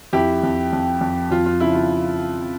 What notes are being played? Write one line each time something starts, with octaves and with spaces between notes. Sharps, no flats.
F2 E4 G4
F2
F2
F2
F2 F4
F4
C#3 E4
F4